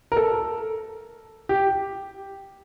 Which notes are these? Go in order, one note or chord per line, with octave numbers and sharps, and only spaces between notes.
A#4
A4
G4